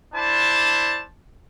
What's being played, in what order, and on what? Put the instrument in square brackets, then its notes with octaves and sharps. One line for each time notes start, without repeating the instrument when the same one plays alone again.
[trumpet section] D4 E4 C5 A5